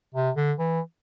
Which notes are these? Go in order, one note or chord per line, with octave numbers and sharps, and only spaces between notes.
C3
D3
E3